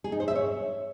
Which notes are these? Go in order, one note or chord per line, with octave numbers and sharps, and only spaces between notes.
G#4
D#4
C5
E5
C#5